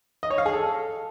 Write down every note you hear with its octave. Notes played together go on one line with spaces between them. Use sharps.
D#5
C#5
F5
G#4
A4